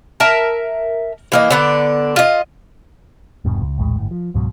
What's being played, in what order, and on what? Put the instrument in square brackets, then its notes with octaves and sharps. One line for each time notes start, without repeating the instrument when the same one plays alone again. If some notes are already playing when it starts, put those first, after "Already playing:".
[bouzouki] A#4 E5 A5
E3 A#3 D#5
D3 B3 D4
F4 D#5
[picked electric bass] D#1 G2 B2
C#2
A#1 D#2 A2 G#3
G1 A2
F3
C#2 G#2 B2 F#3